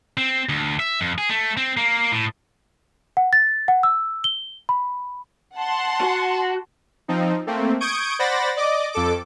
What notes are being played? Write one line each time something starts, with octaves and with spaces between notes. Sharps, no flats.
C4
D2
E5
F2
G#4
A3
C4
A#3
A2
F#5
A6
F#5
E6
G7
B5
F#5 A5 C6
F#4
F3 C4 D#4
A3 A#3 C4
C#6 D#6 G6 G#6 D7
C5 D5 F#5 B5 A6 A#6
D5 D#5 D6
F2 A4 D6